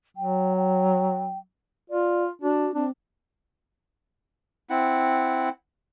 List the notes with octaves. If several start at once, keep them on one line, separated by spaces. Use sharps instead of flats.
F#3 G5
G5
F4 D5
D4 F#4
C4 D4
C4 E4 F#5